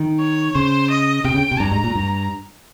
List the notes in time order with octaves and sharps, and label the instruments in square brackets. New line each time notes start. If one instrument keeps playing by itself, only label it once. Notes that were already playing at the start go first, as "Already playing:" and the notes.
Already playing: [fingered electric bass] D#3
[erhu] C#5
[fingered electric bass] C#3 [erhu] C5
[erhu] D#5
[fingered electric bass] C3 [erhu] G5
[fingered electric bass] C#3
C3
[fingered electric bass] G2 [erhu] A#5
[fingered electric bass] G#2
A#2
G2